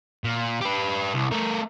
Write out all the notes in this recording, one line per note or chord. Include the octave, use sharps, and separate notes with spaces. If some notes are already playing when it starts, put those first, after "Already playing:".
A#2
G4 B4
C2
A3 A#4